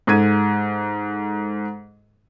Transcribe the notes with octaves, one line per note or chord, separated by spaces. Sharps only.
G#2 A4 G#6 D#7